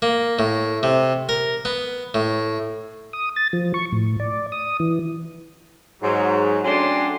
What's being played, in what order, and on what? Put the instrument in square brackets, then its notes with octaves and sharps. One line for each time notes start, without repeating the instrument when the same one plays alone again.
[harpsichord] A#3
A2
C3
A#4
B3
A2
[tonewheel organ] D#6
A6
F3
C#6
A2
D5
D#6
E3
[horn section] G#2 F#3
F#3 A3 C#4 D4 G5 C6